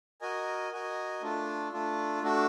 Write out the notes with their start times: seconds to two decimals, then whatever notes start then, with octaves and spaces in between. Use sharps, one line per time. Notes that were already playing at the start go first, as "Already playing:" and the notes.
0.21 F#4 A#4 D#5 G#5
0.72 F#4 A#4 D#5 G#5
1.22 A3 D4 F4
1.72 A3 D4 F4
2.22 A3 D4 F#4